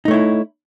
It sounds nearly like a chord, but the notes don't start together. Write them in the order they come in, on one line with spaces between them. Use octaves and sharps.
D#4 A3 C#5 E4